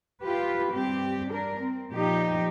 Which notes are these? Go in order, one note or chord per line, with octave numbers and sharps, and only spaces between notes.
F4 G4 B4
G2 C4 G4
D4 A#4
C4
A#2 F3 D#4 G4